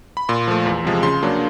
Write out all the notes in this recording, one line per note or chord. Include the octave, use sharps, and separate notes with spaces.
B5
A#2 C6
F3 A3
E2
C3 F3 G#3
C#3 C6
F#3 A#3 D4